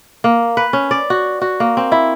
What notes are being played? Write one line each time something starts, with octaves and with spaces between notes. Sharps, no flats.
A#3
B4
C#4
D5
F#4
F#4
A#3
C4
E4